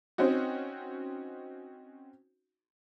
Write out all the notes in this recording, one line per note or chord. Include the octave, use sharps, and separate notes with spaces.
C4 C#4 D#4 F#4